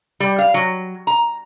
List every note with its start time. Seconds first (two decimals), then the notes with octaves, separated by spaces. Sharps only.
0.20 G3
0.39 F5
0.54 F#3
1.07 A#5